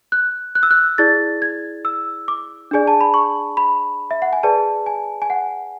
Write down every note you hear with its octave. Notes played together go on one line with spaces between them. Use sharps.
F#6
F#6
E6
F#6
E4 G#4 D5 A6
G#6
E6
D6
D4 G#4 D5 G#5
A5
B5
C#6
B5
E5
F#5
G#5
G#4 B4 D5 A5
G#5
G#5
F#5